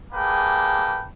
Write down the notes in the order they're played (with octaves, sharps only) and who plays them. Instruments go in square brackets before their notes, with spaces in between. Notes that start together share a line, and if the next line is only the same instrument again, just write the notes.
[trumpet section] G3 A#3 G#4 B4 G5 A5